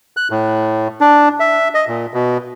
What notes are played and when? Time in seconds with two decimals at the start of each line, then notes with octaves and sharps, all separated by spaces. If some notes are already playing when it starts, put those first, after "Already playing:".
0.17 F#6
0.31 A2
1.01 D4
1.40 E5
1.75 D#5
1.88 A#2
2.14 B2